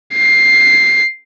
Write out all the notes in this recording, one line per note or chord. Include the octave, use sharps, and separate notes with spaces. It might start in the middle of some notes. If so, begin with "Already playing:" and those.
C7